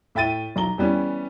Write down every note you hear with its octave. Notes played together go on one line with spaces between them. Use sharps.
A2 E5 G5 A6 D#7
B1 A#5 G7
E3 G3 B3 C#4